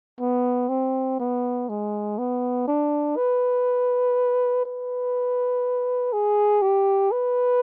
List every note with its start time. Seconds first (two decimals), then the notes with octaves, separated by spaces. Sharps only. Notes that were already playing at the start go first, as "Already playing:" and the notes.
0.20 B3
0.69 C4
1.20 B3
1.69 G#3
2.18 B3
2.68 D4
3.17 B4
4.65 B4
6.13 G#4
6.62 G4
7.12 B4